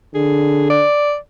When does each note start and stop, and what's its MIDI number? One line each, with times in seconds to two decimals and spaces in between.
0.15 0.83 50
0.15 0.69 68
0.70 1.16 74